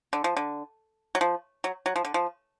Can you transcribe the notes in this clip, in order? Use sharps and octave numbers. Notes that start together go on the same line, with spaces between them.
D3
F3
D3
F#3
F3
F#3
F#3
F3
D3
F3